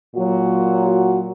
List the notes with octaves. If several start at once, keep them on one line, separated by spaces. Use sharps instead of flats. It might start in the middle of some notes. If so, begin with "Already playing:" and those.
A#2 F#3 F#4
F#4